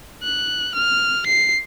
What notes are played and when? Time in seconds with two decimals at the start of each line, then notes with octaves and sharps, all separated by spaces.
0.23 F#6
0.75 F6
1.27 C7